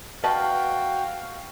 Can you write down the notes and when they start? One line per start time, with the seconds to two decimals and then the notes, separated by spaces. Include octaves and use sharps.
0.24 F#4 B4 D#5 F5 G5 A5